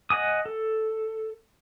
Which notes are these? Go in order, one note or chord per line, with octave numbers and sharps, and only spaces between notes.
D#5 F#5 G#5 D#6
A4